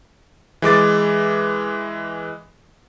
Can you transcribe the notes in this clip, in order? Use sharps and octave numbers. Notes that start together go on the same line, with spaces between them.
E3 G#3 D6 A6